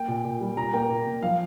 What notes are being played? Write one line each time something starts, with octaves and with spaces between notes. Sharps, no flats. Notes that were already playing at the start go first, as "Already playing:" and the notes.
Already playing: A#3 G5
A#2
A#2
G3
A#2 A#5
A#3 G5
A#2
A#2
F3 F5